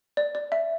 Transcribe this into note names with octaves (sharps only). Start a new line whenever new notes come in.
D5
D5
E5